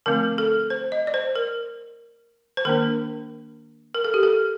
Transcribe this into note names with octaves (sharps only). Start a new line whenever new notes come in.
D3 F3 A3 C4 A#4
A4
C5
D#5
D5
C5
A#4
C5
D#3 A#3 D4 A#4
A#4
A4
G4
A4